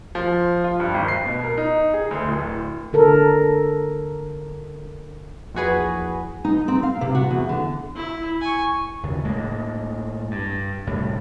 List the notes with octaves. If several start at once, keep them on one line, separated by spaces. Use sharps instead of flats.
F3
F4
G2
G#1
C7
B2
A#4
D#4
G#4
D2
D1
D3 A4 A#4
A#1 E2 F#4 G#4 B4
D#4
C4
F5
C3
F#4
E2
D3
E4
G#5 C#6
D#2 C#3
A2 G#3 A#3
G2
C2 A2 G3